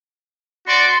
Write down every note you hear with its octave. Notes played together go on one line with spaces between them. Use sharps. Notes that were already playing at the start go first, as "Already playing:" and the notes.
F#4 D5 C6 C#6